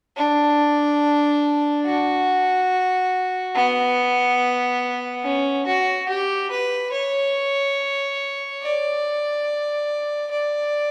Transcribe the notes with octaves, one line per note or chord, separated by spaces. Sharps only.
D4
F#4
B3
C#4
F#4
G4
B4
C#5
D5
D5